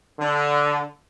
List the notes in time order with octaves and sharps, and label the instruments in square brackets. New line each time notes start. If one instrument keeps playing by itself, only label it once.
[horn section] D3